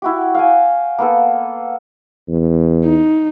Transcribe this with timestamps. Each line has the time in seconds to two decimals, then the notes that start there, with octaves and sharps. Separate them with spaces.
0.02 E4 F#4 G4
0.35 F5 G5 G#5
0.98 A#3 B3 A4
2.28 E2
2.84 D#4